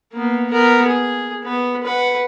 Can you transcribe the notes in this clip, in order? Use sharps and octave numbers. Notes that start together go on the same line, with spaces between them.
A#3 B3
B3 A#4
G#4
B3 B4
B4 F#5